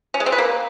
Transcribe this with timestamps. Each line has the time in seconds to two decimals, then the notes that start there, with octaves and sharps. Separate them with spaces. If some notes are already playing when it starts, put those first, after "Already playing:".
0.14 C#4
0.20 G#3
0.26 C4
0.32 B4
0.38 A#3